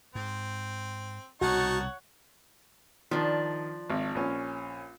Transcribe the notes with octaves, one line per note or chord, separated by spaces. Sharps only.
G#2 C4
C2 B2 D#4 F#4 C#5 F#5 A5 C#6
D#3 F3 D4
G#1
A#1 C#4